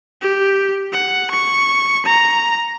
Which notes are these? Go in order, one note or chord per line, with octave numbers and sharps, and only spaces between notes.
G4
F#5
C#6
A#5